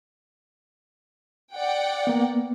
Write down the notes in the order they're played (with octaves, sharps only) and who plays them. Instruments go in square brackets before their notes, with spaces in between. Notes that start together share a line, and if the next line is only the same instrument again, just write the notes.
[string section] D5 F#5 G5
[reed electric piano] A#3 B3